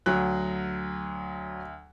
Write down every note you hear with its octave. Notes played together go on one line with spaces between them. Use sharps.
D2 F#3 F#6